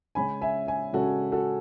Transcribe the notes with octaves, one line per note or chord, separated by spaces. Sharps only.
C#3 G#3 C#4 G#5 B5
E5 G#5
E5 G#5
C#3 G#3 C#4 F#4 A4
F#4 A4